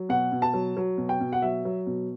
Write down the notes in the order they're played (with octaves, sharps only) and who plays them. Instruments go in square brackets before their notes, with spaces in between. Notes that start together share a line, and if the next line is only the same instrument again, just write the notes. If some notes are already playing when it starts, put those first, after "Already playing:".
Already playing: [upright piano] F#3
B2 F#5
B2
A5
F#3
F#3
B2
G5
B2
F#5
F#3 E5
F#3
B2